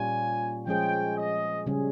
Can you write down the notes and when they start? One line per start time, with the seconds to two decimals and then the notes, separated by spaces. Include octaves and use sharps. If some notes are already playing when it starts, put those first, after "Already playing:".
Already playing: A#2 G3 C#4 F4 G#5
0.66 F3 G#3 C#4 G#4 C5 G5
1.17 D#5
1.67 C#3 G3 C#4 G#4